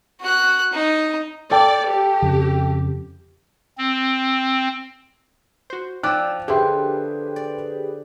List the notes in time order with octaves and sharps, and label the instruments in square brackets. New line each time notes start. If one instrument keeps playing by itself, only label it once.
[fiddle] F#4 F#6
D#4
[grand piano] A4 G5 [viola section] D5
[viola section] G4
[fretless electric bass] F2 C#3
[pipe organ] C4
[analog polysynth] F#4 C5
[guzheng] F3 [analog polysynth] D5 E6 [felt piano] G5 D6 F#6
[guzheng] D3 [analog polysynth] G4 G#4 B4 [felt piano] E5 G5 C6
[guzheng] D5